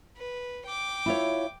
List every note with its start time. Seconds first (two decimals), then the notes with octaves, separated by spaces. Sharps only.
0.18 B4
0.66 G5 D6
1.06 E4 F4 C#5